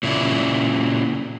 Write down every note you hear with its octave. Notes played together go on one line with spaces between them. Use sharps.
A#2 C#3 E4